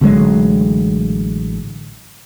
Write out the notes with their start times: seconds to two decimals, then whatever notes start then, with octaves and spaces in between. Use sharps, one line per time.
0.01 A1 D3 F#3 G#3